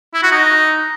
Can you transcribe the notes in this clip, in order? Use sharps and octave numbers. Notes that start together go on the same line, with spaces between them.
E4
F#4
D#4